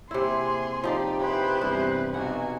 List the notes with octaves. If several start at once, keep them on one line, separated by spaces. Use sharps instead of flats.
C3 A#3 E4 G#4 C6
F3 D#4 G4 D5
E4 G#4 B4 C5
E2 G2 C3
B1 B2 D#4 F#4 F#5 G#5